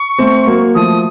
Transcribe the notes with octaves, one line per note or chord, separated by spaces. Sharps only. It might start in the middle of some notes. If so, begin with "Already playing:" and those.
Already playing: C#6
A3 C4
F#3 A#3
F3 A3 D#6